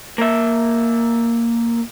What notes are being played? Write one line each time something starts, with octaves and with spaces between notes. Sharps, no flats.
A#3 E5